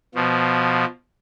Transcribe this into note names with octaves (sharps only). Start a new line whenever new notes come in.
B2 F3